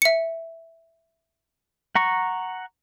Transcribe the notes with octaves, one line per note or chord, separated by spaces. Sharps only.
E5 C#7
F#5 A#5 C#6